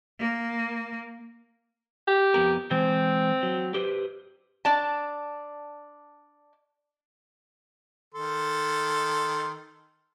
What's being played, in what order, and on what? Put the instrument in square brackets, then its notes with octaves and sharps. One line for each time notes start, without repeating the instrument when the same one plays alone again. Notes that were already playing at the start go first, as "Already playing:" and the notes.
[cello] A#3
[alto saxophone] G4
[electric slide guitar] F2 B3 A#4
[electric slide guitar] E3 G#3 C5 [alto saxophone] C4
[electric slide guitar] F#3
G4 B4 C5
[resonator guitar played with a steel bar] D4 D5 A5
[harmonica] D#3 A4 C6